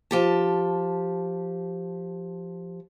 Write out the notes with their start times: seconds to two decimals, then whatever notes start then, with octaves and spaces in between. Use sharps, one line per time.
0.11 F3 G4 A5